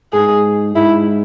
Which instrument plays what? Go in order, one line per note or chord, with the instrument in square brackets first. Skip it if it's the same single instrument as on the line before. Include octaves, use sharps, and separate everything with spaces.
[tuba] G#2 [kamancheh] G#4
[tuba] G#2 [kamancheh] E4